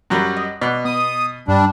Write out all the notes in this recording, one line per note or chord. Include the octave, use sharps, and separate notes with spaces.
F#2 F#3 G3
D#5
B2 D5 F#5
B3 D#6
G2 G3 D4